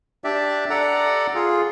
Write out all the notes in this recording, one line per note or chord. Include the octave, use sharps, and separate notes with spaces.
D4 G4 D5 E5
A4 D5 F#5 A#5
F4 G#4